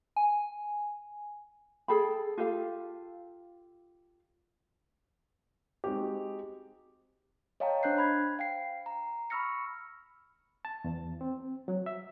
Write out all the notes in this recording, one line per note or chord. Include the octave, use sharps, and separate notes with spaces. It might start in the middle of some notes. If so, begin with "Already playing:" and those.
G#5
G#4 A4 G5 B5
F4 G4 A4 F5
G#3 C4 D#4 F#4 G4
C#5 D#5 F5 G5 A5 A#5
D4 C5 F#6 G6 C7
C5 B5 G#6
F5 G5 C7
A#5
B5 C#6 E6 F6 A#6 C#7
A5
E2
C4
F#3
E5